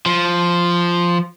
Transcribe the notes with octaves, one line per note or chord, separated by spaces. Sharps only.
F3